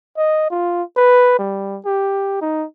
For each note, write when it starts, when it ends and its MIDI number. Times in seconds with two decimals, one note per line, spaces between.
0.17 0.49 75
0.50 0.83 65
0.96 1.37 71
1.39 1.79 55
1.85 2.38 67
2.41 2.65 63